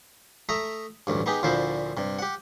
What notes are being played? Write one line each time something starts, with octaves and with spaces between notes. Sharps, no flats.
A3 E5 A#5 D#6
A1 D2 G2
B3 D#4 G4 G#4 B4
D2 A#2 D3 F3 E4 C5
G2 C3
G4 F#5